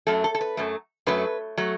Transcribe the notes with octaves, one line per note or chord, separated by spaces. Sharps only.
F#2 F#3 A3 A4
A4
A4
B4
F#2 F#3 A3
F#2 F#3 A3 B4
F#3 A3